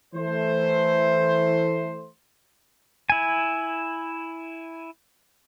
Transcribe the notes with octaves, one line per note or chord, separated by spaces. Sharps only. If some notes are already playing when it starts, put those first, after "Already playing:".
E3 A3 C5
E4 G#5